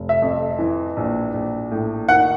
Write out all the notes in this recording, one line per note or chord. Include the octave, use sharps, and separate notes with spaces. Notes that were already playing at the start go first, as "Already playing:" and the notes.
Already playing: F1
E5
F2
E3
A#1
A#1
A2
D#3 F#5